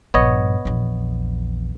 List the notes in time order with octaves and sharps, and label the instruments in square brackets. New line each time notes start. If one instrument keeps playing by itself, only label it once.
[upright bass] A#1 G2 [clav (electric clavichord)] B3 C#5 D#5
[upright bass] A#1 E2